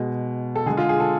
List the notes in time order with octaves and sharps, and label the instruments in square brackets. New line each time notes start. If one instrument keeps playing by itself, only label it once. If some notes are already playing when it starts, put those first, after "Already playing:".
Already playing: [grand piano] B2 G#3
A4
D3 G#3 G#4
F4
G#4
A4